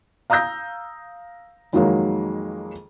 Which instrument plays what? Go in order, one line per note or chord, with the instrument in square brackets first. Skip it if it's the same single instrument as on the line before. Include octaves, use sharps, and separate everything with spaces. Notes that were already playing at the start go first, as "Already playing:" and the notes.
[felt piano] F5 A#5 D#6 E6 G6 A#6
F2 D#3 F#3 G#3 A#3